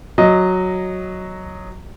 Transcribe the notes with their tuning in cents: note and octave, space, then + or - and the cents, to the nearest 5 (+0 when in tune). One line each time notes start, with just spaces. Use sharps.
F#3 +0 D#5 +0